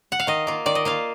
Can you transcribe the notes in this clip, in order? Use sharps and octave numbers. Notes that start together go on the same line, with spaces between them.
F#5
F5
D#3 D#5
A#3 F4
D#3 D5
D#5
A#3 F4 F5